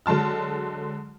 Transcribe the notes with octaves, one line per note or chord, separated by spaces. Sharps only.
D3 F#3 G#3 A5 F6